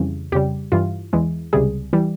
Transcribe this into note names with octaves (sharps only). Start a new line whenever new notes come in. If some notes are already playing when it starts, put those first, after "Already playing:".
Already playing: F2 C#3 E3 G3
F2 C#3 G3 G4
G2 E3 G3 F4
E2 E3 G#3
C#2 C3 G3 G#4
E3 G3